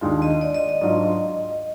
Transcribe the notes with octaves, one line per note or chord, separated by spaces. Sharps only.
D#2 D#3 G#3 D4 F4
D#5
D5
D#5
D#5
G#2 F#3 D4 F4